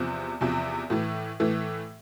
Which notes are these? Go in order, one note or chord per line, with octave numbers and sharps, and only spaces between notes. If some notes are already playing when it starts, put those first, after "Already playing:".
Already playing: E2 C3 F3
E2 C3 F3
A2 E3 A3
A2 E3 A3